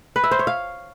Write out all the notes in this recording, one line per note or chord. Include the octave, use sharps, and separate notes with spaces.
B4
E5
C5
C#5
F5